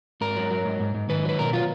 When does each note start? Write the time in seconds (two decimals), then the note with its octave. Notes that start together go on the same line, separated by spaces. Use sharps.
0.21 G#2 A#4
0.37 F#3
0.51 F#3
0.65 G#2
0.80 G#2
0.95 G#2
1.09 D#3 B4
1.25 F#3 B4
1.39 B2 A#4
1.53 F#3 F4